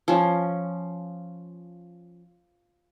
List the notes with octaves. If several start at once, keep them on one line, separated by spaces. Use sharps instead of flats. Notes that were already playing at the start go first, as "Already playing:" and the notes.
F3 C#4